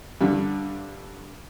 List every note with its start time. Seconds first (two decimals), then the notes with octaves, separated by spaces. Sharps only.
0.21 G2 D3